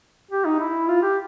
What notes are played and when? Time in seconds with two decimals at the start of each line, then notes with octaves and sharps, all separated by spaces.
0.31 G4
0.45 D#4
0.59 E4
0.88 F4
1.03 G4